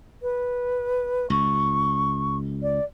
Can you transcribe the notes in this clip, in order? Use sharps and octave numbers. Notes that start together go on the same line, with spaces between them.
B4
C#2 C#6
D5